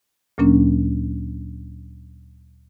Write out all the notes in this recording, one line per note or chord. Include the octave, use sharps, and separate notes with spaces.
D2 A#2 F#3 A#3 C#4 D4